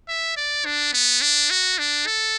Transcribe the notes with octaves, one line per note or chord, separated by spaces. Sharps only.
E5
D5
D4
B3
D4
F#4
D4
A4